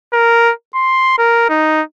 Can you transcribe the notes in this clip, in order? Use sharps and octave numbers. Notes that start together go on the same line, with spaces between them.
A#4
C6
A#4
D#4